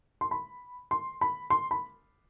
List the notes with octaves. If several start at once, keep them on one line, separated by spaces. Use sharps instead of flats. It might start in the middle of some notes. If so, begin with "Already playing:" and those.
C6
B5
C6
B5
C6
B5